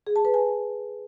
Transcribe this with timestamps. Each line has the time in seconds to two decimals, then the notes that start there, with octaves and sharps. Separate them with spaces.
0.07 G#4
0.16 A5
0.25 B4
0.34 G#5